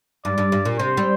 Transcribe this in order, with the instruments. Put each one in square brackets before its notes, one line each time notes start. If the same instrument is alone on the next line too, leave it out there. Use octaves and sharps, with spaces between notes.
[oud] G2 [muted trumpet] D5
[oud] G2
G2
A#2
[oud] C3 [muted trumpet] C5
[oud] G3 C4